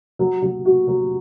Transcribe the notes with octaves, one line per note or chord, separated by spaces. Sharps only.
F#3
F#3
F#4
F#3